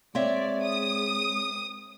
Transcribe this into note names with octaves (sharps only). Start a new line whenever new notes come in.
G#3 C4 C#5 D5 E5
D#6